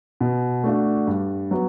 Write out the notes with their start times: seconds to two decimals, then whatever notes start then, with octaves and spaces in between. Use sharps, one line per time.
0.21 B2
0.64 A3 D4 F#4
1.07 G2
1.51 F#3 B3